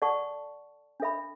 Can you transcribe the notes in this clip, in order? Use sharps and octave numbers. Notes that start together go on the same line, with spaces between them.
A4 D5 F#5 A5 C#6
D4 A4 E5 B5